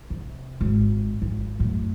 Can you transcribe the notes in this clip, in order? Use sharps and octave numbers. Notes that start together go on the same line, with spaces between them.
C3
G#1
G#1
F#2 A2